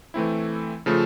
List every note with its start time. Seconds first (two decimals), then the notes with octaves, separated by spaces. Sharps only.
0.14 E3 A3 C4 E4
0.86 C#3 F3 A3